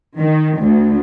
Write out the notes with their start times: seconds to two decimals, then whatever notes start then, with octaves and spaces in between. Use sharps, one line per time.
0.17 D#3
0.61 D2